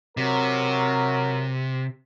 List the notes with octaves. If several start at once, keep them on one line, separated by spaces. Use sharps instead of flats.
C3 F#3 A#4